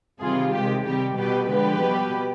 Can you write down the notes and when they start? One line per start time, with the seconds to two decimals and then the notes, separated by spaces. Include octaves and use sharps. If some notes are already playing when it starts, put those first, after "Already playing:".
0.20 C3 D#3 G3 F4 G#4
0.52 C3 D#3 G#3 G4
0.85 C3 G3 G4
1.16 B2 G3 G4 B4
1.48 D3 F3 G#3 G4 B4
1.80 B2 G3